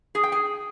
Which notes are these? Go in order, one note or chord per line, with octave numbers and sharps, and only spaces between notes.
G#4
G5
G#4